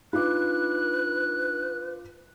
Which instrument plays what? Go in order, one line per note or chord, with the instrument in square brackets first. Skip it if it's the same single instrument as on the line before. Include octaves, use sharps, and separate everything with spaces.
[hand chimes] D4 D#4 B5 [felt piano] F4 D6 [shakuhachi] B4 [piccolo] F#6